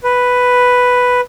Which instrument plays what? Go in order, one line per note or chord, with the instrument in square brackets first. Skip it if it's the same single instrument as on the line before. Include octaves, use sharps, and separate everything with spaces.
[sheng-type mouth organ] B4